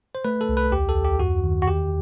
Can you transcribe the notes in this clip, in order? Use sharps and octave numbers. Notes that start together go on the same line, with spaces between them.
C5
A3 B4
A4
C2
B4
D#2 G4
A4
D#2
G4
F#2 F#4
D#3
F#4
E2 G4